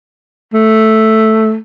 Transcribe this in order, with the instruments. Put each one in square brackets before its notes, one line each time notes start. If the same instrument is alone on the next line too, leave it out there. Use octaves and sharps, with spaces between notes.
[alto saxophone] A3